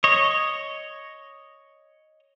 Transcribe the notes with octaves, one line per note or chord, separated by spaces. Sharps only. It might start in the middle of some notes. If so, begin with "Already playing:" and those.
C#5 D#5